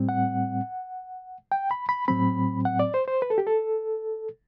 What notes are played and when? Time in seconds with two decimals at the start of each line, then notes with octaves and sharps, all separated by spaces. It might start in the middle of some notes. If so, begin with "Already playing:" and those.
Already playing: A2 G3 C4
0.09 F#5
1.52 G5
1.71 B5
1.89 B5
2.08 A2 F#3 C4 B5
2.65 F#5
2.79 D5
2.94 C5
3.08 C5
3.22 B4
3.30 A4
3.38 G4
3.47 A4